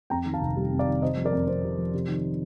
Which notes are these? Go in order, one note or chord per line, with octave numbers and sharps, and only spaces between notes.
F2 G5 A#5
D#3
F5 A5
F1
G3
F2
D5 F5
D#3
C3 C5 D#5
F3
A#4 D5
F2
F2 C5
C3
F3
C3
D#3